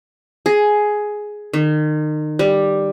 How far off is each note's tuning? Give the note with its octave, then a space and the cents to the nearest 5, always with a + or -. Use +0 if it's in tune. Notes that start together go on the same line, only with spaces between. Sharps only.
G#4 +10
D#3 -30
G3 +5